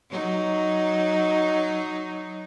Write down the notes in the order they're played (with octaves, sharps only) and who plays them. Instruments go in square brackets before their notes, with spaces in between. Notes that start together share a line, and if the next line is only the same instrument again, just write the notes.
[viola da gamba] F#3 D#4